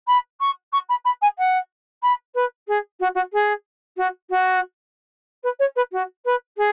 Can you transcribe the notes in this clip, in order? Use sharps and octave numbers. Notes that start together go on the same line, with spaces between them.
B5
C#6
C#6
B5
B5
G#5
F#5
B5
B4
G#4
F#4
F#4
G#4
F#4
F#4
B4
C#5
B4
F#4
B4
G#4